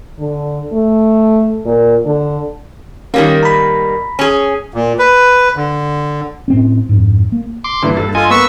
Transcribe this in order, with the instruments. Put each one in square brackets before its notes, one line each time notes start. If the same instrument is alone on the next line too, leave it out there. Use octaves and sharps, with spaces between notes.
[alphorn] D3
A3
A#2
D3
[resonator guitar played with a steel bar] D#3 G3 A#3 [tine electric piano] C#4
[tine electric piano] A#5 B5
[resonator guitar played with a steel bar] C#4 G#4
[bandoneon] A#2
B4
D3
[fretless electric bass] A2 C4 C#4
F2 G#2
A#3
[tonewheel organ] C6 D6
[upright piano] G2 A#2 E3 [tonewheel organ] D3
[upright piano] G2 [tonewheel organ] A4
[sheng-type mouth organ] F4 [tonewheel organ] A4 D#5 G#5
[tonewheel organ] A#3 B3 B4 [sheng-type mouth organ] C#6 E6